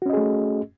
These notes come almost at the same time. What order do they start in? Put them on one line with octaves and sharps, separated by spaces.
F#4 C#4 D#5 G#4 A3